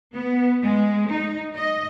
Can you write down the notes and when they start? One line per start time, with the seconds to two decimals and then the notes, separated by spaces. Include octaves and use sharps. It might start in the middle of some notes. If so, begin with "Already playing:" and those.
0.15 B3
0.64 G#3
1.10 D#4
1.56 D#5